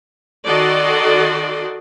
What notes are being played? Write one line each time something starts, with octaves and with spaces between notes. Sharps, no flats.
D#3 F#4 A4 D5 D#5 C6